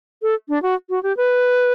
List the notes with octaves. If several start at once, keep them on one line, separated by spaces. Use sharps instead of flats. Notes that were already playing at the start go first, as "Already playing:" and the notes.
A4
D4
F#4
F#4
G4
B4